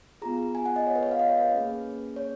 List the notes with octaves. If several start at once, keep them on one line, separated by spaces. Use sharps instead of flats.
B3 F4 G#4 A#5
G#5
F#5
D#5
C#5
B4
C#5
F5
D#5
C#5
B4
A#3 C#4 G#4
C#5